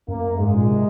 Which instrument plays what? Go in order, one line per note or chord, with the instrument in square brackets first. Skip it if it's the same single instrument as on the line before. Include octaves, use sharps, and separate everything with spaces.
[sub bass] F#2 [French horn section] A#3
[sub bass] G#2 [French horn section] G#3
[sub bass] A#2
C3